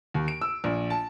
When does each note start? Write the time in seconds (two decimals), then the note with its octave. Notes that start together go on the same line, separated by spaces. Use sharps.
0.14 D#2
0.28 D7
0.41 E6
0.64 A#1
0.90 A5